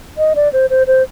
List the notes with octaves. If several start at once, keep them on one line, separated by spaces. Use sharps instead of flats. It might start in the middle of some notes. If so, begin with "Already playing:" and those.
D#5
D5
C5
C5
C5